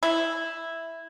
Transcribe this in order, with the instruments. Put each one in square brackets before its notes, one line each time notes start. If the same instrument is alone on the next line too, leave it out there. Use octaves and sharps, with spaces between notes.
[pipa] E4